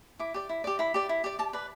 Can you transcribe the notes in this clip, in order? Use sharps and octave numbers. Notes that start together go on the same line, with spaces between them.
E4 D6
G4 D5
E4
G4 D5
E4 B5
G4 D5
E4
G4 D5
G4 A5
B4 D5